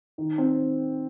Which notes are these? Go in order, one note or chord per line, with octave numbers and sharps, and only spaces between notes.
D#3
C4